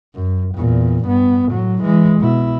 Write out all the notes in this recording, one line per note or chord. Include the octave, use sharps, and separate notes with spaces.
F#2
E2 A#2
G2 B3
A2 F#3
E3 G#3
B2 E4